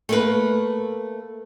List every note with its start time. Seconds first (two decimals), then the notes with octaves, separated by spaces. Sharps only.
0.09 A3 A#3 B4